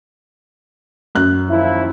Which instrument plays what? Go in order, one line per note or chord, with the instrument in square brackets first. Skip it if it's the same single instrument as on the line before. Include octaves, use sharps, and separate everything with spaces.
[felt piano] F#2 F#6
[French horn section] D#2 F3 E4